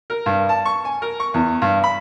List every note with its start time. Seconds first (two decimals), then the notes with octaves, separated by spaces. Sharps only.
0.10 A#4
0.26 G2
0.49 A5
0.65 C#6
0.85 G#5
1.02 A#4
1.20 C#6
1.34 E2
1.62 G2
1.84 B5